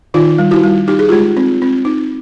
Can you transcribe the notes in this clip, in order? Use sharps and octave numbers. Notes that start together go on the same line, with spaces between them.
D#3 D#4 F4
G3
E4 F#4
G3
D#4 G4
G#4
G#3 F4 G4
C4
C4
D#4